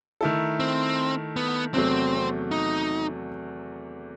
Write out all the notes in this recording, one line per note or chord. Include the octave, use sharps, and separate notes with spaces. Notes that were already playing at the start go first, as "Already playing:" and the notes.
D#3 A3 E4 A4
C4
B3
E2 C3 F#3 A3 C4
D#4